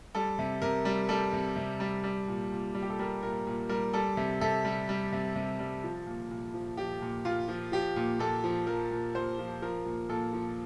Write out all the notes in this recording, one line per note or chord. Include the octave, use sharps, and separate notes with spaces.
G3 A4
C3
C3 A#4
G3
G3 A4
C3
C3
G3
G3
A#2
A#2
G3
G4
A4
G3 A#4
A#2 A#4
A#2
G3 A#4
G3 A4
C3
C3 A4
G3
G3
C3
C3
G3
F3
A#2
A#2
F3
F3 G4
A#2
A#2 F4
F3
F3 G4
A#2
A#2 A4
F3
F3 A#4
A#2
A#2 C5
F3
F3 A#4
A#2
A#2 A4
F3